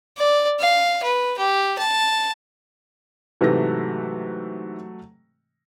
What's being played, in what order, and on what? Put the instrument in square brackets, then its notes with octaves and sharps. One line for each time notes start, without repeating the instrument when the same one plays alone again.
[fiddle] D5
F5
B4
G4
A5
[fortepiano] G#2 C3 E3 [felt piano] F#3 A3 A#6